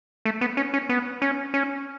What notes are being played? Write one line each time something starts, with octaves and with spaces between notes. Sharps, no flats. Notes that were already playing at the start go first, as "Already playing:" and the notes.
A3
B3
C#4
C#4
B3
C#4
C#4